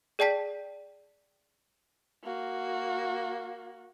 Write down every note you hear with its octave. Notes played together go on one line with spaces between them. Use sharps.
G#4 D5 G5 A5 B6
A#3 F#4